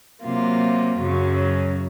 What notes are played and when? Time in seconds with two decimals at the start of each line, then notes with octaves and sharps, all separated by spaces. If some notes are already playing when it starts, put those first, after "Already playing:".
0.23 C3 F#3 A#3 F4
0.97 F#2 C#3 F#3